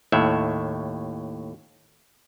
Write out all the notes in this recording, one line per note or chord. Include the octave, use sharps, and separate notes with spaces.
D#2 A2 E5